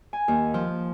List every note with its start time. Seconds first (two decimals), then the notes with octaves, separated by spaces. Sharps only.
0.13 G#5
0.28 D#2
0.54 F3